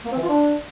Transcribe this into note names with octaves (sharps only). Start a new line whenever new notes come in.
A#3
C4
E3
F4
D4